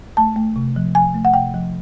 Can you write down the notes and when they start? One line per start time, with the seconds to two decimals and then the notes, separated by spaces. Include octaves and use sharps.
0.17 A3 A5
0.36 A3
0.56 C3
0.76 F3
0.95 F3 G#5
1.14 A3
1.25 F#5
1.34 C3 G5
1.54 F3